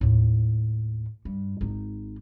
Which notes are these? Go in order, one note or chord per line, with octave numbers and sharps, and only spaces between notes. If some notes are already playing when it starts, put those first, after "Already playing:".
D#2 A2
G2
G#1 D#4